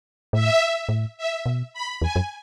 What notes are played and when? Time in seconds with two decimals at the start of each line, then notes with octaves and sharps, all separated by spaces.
0.33 A2 E5
0.89 A2
1.18 E5
1.46 B2
1.73 B5
2.02 E2 G#5
2.16 F#2